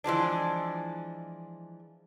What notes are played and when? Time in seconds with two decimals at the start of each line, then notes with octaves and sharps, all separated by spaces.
0.04 E3 F3 G#3 D4